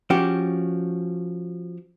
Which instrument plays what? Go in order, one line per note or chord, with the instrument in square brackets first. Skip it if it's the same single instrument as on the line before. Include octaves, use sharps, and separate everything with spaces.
[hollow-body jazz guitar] F3 C#4 F#4 G4